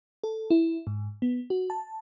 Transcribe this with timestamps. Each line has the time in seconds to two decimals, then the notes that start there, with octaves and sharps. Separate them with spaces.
0.24 A4
0.50 E4
0.87 G#2
1.22 B3
1.50 F#4
1.70 A5